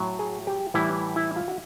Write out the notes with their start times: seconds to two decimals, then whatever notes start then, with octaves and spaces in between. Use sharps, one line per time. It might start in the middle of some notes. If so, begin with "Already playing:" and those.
Already playing: A2 F#3
0.19 G#4
0.47 G4
0.74 A2 E3 G3 E4
1.16 E4
1.36 F4
1.48 F#4